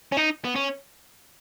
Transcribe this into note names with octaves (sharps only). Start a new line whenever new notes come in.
C#4
D#4
B3
C#4